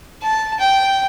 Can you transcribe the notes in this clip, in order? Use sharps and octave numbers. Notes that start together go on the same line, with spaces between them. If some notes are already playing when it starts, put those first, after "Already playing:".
A5
G5